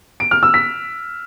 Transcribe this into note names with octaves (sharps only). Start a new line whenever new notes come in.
D7
F6
E6
B6